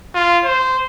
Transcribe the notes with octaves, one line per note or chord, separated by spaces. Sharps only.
F4
C5